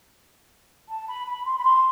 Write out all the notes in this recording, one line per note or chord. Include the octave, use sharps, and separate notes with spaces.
A5
B5
B5
C6
B5
C6